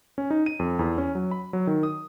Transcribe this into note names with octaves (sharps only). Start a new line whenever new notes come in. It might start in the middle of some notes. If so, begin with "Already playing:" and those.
C#4
D#4
D#7
F2
E2
C#4
F#3
B5
F#3
D#3
D#6